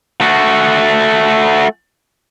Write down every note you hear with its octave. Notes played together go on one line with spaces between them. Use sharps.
A3 F#4